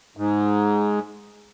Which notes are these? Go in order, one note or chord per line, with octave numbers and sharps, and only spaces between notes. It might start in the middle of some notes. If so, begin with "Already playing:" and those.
G#2